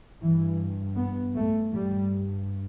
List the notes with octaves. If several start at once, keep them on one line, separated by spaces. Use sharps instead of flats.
G2 E3
B3
A3
G2 G3